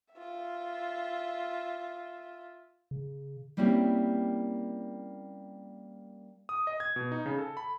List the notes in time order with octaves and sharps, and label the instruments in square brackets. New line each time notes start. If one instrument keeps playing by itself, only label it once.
[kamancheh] F4 E5
[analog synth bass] C#3
[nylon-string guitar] G3 A#3 C4 C#4 E4 G4
[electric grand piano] D#6
D#5
G#6
B2
D#4
C#3
A4
B5